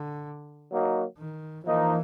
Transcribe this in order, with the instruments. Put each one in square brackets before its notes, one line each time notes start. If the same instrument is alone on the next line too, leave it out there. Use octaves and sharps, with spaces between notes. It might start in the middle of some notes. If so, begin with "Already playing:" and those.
Already playing: [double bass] D3
[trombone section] F#3 A#3 D#4 F#4
[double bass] D#3
[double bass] E3 [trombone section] F3 A#3 D#4